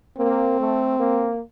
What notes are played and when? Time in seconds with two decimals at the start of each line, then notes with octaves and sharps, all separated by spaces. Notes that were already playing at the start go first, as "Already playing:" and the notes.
0.18 A#3 C4
0.59 A3
0.99 A#3